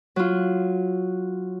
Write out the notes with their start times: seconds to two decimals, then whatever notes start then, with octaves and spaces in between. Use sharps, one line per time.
0.16 F#3 F4